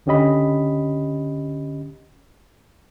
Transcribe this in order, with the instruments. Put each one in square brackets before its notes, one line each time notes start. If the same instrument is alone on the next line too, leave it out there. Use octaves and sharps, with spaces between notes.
[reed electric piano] C#2 D3 C#4 G4 D#5 B5